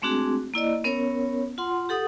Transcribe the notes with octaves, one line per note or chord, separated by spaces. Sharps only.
G#3 A3 C4 D4 F#4 G#4
A#3 E4 D5 D#5
B3 C#4 A#4 C#5
F4 F#5 C6
G4 A4 F#5 D#6